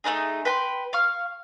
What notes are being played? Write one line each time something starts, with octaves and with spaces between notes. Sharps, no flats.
A3 C#4 D#4 G#4
B4 G5 B5 C6
F5 C#6 F6